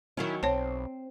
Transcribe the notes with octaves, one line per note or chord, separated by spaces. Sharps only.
D#3 F#3 C#4 E4
B1 C4 C#5 A5